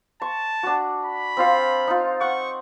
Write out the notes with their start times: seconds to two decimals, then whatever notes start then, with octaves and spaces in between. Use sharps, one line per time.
0.22 A5 C#6
0.63 D4 F#4
1.06 B5
1.37 C4 F4 F5
1.87 D#4 F4
2.21 F#5 C#6